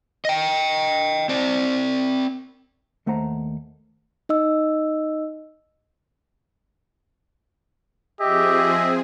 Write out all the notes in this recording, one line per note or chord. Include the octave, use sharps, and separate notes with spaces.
D#5 G5
C4 D5
D#2 A3 C5 F#5 A#5
D#4 D#5 E6
F3 C4 G4 G#4 D#5 E5